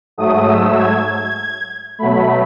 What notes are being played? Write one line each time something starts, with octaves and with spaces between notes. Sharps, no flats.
G#2 F#3 A3 D#6
E6
G#6
G#6
B2 F#3 A3 B5